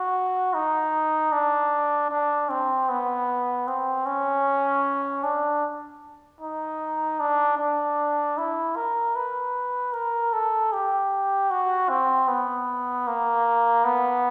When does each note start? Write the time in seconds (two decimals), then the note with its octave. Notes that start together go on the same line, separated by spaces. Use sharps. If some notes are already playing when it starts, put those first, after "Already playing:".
Already playing: F#4
0.54 D#4
1.32 D4
2.11 D4
2.49 C4
2.89 B3
3.67 C4
4.06 C#4
5.23 D4
6.41 D#4
7.20 D4
7.58 D4
8.37 E4
8.76 A#4
9.15 B4
9.93 A#4
10.33 A4
10.72 G4
11.50 F#4
11.89 C4
12.28 B3
13.07 A#3
13.85 B3